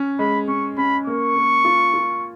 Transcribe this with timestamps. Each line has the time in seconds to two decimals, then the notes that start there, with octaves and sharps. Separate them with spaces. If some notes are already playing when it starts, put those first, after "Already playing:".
Already playing: C#4
0.19 G#3 B5
0.48 C#4 C#6
0.78 C#4 B5
1.07 A#3 C#6
1.36 A#3
1.65 F4
1.94 F4